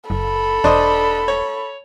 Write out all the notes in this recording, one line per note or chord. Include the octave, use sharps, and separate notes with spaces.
F#1 A4 B5
E1 D4 C5 D#5
C#5